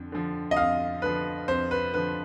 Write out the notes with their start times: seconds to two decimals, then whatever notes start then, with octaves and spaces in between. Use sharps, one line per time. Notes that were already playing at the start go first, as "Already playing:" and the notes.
Already playing: F2 D3
0.12 D3 F3
0.51 D#5
0.57 F2 F5
1.02 D3 F3 B4
1.48 F2 C5
1.71 B4
1.94 D3 F3 B4